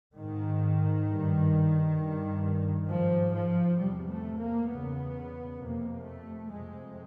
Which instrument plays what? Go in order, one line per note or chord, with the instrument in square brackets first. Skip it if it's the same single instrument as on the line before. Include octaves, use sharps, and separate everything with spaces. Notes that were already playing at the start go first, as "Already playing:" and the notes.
[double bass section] G#2 D#3
G2
G2
G#2 F3
F3
E2 C3 G3
A3
A#3
E2 C#3 B3
F2 C3 A#3
A3
F2 C3 G#3